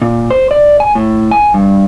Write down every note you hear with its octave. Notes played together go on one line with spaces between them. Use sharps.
A#2
C5
D5
G#5
A2
G#5
G2